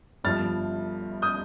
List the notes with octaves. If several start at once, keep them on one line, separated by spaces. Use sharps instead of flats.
G1 G2 F3 F6 A6
D#6 G6